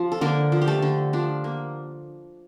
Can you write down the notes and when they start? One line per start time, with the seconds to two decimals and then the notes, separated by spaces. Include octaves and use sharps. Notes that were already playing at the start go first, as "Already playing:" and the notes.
Already playing: F3
0.12 A4
0.21 D3 A#3 A#4
0.52 F3
0.62 G4
0.68 A3 A4
0.82 D3
1.13 F3 D4
1.44 A#3